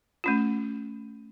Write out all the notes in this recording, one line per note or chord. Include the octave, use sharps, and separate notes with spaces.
A3 C#4 F4